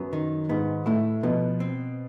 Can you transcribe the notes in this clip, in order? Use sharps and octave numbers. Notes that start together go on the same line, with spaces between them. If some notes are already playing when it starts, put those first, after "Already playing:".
Already playing: F#2 F#3 B3
D#3
G#2 G#3 B3
A2 A3 E4
B2 F3 B3
C4